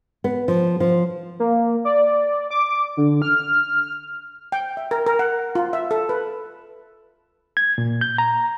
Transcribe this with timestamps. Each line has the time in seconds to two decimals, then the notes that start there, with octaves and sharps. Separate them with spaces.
0.24 B3
0.48 F3
0.80 F3
1.40 A#3
1.85 D5
2.51 D6
2.97 D3
3.22 F6
4.52 G5
4.77 E5
4.91 A#4
5.06 A#4
5.19 F#5
5.55 F4
5.73 E5
5.91 A4
6.09 B4
7.57 G#6
7.78 A#2
8.01 G6
8.18 A#5